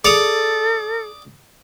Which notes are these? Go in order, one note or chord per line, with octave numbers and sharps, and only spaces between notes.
G#4 A4 D5 D#6 C#7 F7